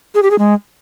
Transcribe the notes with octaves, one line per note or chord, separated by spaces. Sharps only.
G#4
G4
G#4
G#3